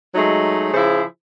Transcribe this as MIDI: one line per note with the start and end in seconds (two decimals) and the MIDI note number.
0.15 0.72 54
0.15 0.72 56
0.15 0.72 57
0.15 0.72 63
0.74 1.02 49
0.74 1.02 53
0.74 1.02 64
0.74 1.02 68
0.74 1.02 72